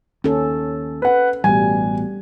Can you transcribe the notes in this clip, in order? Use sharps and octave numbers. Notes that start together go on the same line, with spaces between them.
D#2 C#4 A4
B4 F#5
A1 B2 G3 G#5